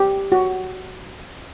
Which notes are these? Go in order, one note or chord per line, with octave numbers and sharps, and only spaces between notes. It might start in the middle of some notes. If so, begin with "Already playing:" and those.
Already playing: G4
F#4